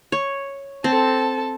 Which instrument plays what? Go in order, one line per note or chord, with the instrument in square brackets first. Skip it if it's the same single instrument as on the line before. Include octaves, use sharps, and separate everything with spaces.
[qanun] C#5
[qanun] C4 [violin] A4 A5